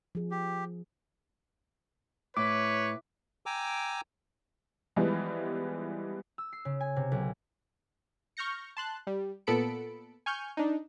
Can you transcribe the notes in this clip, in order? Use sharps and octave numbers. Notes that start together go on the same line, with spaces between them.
F3 G#4
G4
A2 B4 C#5 D6
G5 G#5 A#5 D6 E6
E3 F3 G3 G#3 B3
E6
C7
C#3
G#5
C3
B1
C#6 F6 G6 A#6 C#7
A5 C6 F#6
G3
A#2 B3 A4 B5 C#7 D7
G#5 C#6 F6 G6
D4 D#4